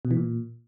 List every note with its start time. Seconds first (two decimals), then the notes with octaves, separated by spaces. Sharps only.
0.05 B2
0.11 E3
0.17 A#2